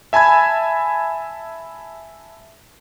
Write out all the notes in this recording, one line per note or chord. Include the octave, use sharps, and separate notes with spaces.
E5 G#5 A5 B5 G#6